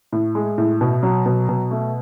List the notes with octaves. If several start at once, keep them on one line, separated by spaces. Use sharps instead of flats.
A2
G#3
A2
B2
F#3
B2
B2
A3